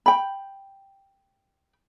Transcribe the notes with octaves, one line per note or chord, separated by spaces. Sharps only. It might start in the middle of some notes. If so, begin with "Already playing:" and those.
G5 B5